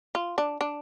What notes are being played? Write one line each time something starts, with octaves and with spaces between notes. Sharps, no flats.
F4
D4
D4